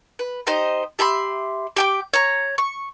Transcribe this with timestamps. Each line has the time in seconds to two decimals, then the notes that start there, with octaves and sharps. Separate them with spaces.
0.19 B4
0.47 D#4 G4 C5 D#5
0.99 G4 E5 B5 C6
1.77 G4 G5 D6
2.14 C#5 A#5
2.58 C#6